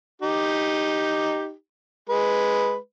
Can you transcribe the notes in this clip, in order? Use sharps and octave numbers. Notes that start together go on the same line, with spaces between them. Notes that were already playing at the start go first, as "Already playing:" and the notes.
D#4 G4
G#3 B4